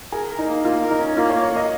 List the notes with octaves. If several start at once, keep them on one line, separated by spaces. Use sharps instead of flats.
G#4 A#4
A#4
D#4
A#3
A#3 F4
A#4
D#4
C#4
A#3 F4
A#3 C#5
F5
A#3 D#5